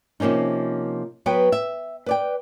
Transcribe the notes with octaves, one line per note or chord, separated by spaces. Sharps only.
C3 F3 A#3 C#4 D#4
F#3 B3 B4 G5
E5
B4 D5 G5